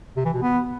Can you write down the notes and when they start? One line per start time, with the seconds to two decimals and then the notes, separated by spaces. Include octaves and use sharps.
0.17 C3
0.25 E3
0.34 B2
0.42 B3